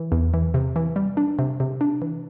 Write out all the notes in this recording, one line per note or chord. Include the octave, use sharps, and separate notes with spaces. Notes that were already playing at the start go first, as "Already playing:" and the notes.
Already playing: E3
E2
E3
C3
E3
G3
D4
C3
C3
D4
E3